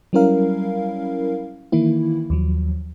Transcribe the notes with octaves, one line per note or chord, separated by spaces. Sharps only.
F#3 G3 C#4 E4 A#4 F5
D#3 E3 A#3 E4
D#2 F3 F#3